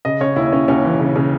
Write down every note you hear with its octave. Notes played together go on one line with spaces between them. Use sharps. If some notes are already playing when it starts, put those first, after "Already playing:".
C#3 D#5
C#3 C#5
D#2 E4
D#2 C#4
D#2 C#4
E3
C#3
C#3